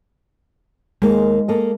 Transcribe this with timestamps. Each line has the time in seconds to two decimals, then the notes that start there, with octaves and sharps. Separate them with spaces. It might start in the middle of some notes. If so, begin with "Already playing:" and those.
1.02 D#2 G#3 A#3
1.48 A#3 A4 D#5